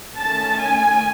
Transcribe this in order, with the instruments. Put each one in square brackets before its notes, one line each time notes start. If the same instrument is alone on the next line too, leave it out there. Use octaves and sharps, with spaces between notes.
[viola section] D#3 A3 C#4 A5
G#5